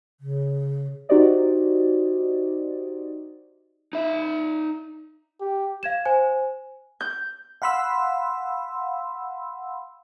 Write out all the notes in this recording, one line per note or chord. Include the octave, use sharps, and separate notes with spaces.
C#3
D#4 F#4 G4 C5 D5 D#5
D#4 E5
G4
F5 G#6 E7
C5 G#5
G6
F5 F#5 B5 C6 E6